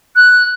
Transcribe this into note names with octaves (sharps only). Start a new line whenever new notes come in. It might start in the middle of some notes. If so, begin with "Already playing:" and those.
F#6